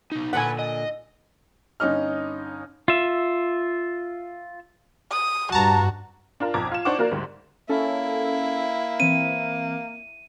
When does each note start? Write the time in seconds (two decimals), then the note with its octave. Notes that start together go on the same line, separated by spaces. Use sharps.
0.12 B3 D#4
0.33 A#2 D3 F4 B4 F#5 G#5 B5
0.59 D#5
1.80 G1 C#4 D#4 D#5 F6
2.88 F4 E5
5.11 D#6
5.52 G2 F#4 A5 A#5
6.40 D4 F4 A#4
6.54 B1 F2 A#5 D6 G#6
6.72 F4 E7
6.85 D4 D#4 C5 F#5 C#6 D6
6.99 A#3 F#4 A#4 D5
7.11 D2 G#2 G3
7.69 A#3 C#4 E4 A4
9.00 E3 C4 D#7